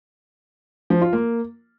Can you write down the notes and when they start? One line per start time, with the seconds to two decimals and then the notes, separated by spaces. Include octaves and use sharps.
0.90 F3
1.02 F4
1.13 A#3